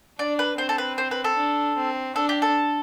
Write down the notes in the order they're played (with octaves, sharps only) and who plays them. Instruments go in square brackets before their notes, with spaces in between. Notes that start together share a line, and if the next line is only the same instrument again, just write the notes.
[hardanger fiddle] D4 [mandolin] D5
[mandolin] B4
[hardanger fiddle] C4 [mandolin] C5
[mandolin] A4
B4
C5
B4
A4
[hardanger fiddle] D4
C4
[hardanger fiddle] D4 [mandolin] A4
[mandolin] G4
A4